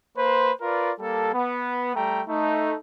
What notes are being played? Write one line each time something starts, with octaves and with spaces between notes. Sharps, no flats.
A#3 B4 C5
F4 A#4 B4 D5
G3 A#3 A4
B3
G3 A3 G5 A#5
A3 D#4